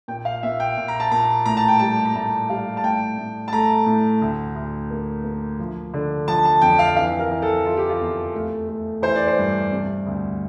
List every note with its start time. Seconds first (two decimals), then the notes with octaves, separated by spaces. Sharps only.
0.08 A#2 G5
0.25 F5
0.43 A#2 E5
0.60 G5
0.77 A#2
0.88 A#5
1.00 A5
1.12 A#2 A#5
1.46 A2 A#5
1.57 A5
1.68 G5
1.79 G3 A5
2.06 A#5
2.15 A2 A5
2.49 G3 F5
2.77 A5
2.83 A2 G5
3.18 A2
3.48 A5
3.53 A3 A#5
3.86 A2
4.21 D2
4.55 D2
4.91 A#3
5.24 A#3
5.59 F3
5.94 D3
6.28 F3 A5
6.45 A5
6.62 F2 G5
6.79 F5
6.96 E3 F5
7.19 A#4
7.31 E3
7.42 A4
7.66 E3 F4
7.77 G4
7.89 F4
8.00 E2
8.34 A3
8.69 A3
9.02 E3 C5
9.15 D5
9.27 C5
9.38 G2
9.72 C3
10.07 D2